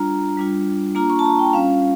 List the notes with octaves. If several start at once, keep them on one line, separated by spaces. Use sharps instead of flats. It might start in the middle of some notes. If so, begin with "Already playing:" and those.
Already playing: G3 D4 F4 A#5
G3 D4 F4
A#3 D4 F4 A#5
C#6
A5
A#5
G5
G3 C#4 F4 F5